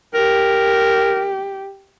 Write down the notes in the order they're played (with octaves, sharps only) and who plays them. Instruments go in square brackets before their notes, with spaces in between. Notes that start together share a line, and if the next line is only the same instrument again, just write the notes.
[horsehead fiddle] G4 [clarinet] A#4